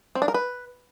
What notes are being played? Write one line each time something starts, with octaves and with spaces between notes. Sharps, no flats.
C4
D4
A#4
B4